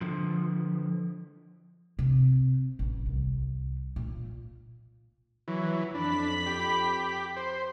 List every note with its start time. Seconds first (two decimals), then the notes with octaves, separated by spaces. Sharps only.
0.01 D3 F3
1.99 C3
2.79 A1
3.06 C2
3.96 A#2
5.48 E3 F#3
5.95 F2 D4 B5 B6
6.46 G4
7.36 C5